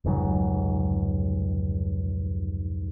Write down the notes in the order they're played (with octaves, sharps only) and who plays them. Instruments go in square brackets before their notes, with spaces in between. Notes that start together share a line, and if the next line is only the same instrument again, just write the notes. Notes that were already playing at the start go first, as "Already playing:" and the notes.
[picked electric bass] F1 C#2 G#2 F#3